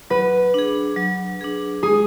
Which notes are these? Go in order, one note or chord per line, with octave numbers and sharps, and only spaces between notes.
F#3 B4
D4 G#4
F#3
D4 G#4
G#3 G#4